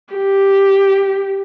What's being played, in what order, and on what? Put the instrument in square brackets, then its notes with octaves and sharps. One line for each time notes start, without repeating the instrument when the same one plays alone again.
[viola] G4